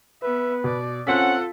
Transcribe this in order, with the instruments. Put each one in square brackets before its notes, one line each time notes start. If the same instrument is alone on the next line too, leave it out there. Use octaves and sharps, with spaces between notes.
[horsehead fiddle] B3 E5 [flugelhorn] B4
[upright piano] B2 [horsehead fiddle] D5
[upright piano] C4 B6 [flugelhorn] C#4 [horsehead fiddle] F4 A4 [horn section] F#5